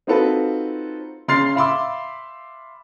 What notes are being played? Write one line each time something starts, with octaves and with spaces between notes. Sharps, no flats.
C4 D#4 F4 F#4 A4 B4
C#3 C6 F6 A6 C7
E5 F5 B5 C6 D6 E6